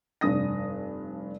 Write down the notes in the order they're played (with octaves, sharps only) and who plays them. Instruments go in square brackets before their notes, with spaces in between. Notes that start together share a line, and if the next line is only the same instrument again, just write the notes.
[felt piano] F1 G2 D4 D#6 A#6